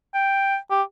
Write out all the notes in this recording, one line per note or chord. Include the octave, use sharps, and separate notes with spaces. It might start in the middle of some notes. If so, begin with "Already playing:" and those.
G5
G4